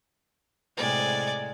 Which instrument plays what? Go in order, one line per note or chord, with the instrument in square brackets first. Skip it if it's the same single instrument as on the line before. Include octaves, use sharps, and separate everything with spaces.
[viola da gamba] A2 C3 G#3 [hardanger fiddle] D5 G#5